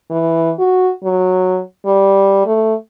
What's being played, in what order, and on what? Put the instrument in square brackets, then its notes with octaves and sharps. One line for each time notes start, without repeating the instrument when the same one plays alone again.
[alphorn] E3
F#4
F#3
G3
A3